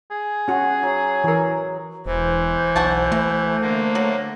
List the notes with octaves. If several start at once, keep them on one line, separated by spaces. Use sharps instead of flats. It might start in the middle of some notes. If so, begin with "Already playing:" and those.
G#4
C#4 F#4
F#3
E3 A#4
E1 E3 C5
B1 D4 F#4 A5
B2 A3
D3 A#3
F#3